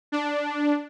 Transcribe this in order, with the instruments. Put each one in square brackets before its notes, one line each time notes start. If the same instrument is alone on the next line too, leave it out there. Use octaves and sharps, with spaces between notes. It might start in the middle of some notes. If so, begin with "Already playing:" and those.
[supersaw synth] D4